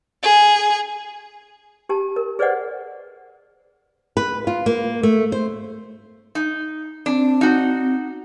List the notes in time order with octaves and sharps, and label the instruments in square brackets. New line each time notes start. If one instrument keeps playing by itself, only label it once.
[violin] G#4
[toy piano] G4 A5
A#4
G#4 B4 C5 D5 D#5 F#5
[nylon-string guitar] B4
F4
A#3
A3
C5
[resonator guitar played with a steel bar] D#4
[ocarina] C4 [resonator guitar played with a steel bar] D4
[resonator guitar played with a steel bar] D#4 F#4